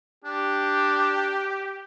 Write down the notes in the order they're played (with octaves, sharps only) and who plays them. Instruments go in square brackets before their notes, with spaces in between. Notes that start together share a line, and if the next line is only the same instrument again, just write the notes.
[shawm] D4 [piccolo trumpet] G4